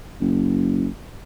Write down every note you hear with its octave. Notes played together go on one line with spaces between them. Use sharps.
F#1